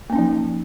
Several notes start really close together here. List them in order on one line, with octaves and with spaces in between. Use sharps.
A#3 C#4 D#4 F3